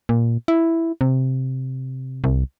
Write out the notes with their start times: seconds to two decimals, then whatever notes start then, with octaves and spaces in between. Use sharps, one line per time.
0.09 A#2
0.48 E4
1.01 C3
2.24 C2